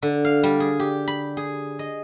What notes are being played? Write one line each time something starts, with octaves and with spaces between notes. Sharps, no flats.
D3
F5
G3
G#4
G4
B5
G#4
D#5